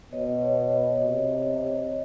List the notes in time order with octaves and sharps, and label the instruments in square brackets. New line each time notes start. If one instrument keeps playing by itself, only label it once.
[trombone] B2 [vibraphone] C#5 D#5
[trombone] C3